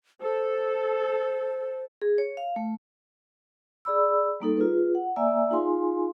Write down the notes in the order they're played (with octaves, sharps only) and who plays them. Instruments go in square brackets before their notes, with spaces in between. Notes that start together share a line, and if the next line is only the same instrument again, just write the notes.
[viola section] A4 [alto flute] C5
[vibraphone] G#4
C#5
F5
A3
G#4 D5 B5 E6
G3 A#3 D#4 A4
F4 G#4 B4
F#5
A#3 D5 E5 G#5 A#5 E6
D#4 F4 G#4 F5 G#5 C6